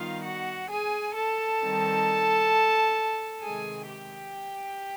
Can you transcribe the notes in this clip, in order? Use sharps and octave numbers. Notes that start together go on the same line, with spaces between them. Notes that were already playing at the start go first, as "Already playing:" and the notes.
Already playing: D#3 G3 B3 D#4 F4 F5
F#4 F#5
G#4 G#5
A4 A5
D#3 G3 C4 D#4
C3 D#3 G#3 G#4 G#5
G4 G5